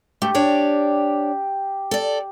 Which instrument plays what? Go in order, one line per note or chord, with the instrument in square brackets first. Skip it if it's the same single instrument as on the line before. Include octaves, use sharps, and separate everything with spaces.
[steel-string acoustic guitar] A3 [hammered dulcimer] G4
[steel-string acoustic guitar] D4 C#5 D5
A4 D5